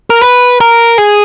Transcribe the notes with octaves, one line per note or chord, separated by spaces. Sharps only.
A#4
B4
A#4
G#4